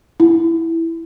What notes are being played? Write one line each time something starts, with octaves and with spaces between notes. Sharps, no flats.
E4